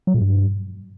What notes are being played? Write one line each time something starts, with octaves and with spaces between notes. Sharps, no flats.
F#3
A#2
G2